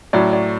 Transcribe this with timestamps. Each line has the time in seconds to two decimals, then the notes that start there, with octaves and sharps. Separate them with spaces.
0.13 A2 F#3 D5
0.33 D5